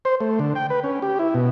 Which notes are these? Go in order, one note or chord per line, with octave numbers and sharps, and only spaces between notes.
C5
A3
D3
G5
B4
C#4
G4
E4
B2